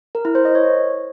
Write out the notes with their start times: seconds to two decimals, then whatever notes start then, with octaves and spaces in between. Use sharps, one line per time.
0.15 A#4
0.25 E4
0.35 C5
0.45 D#5
0.55 C#5